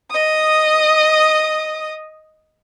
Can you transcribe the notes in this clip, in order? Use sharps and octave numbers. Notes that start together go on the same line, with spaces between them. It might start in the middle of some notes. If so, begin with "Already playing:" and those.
D#5 D#6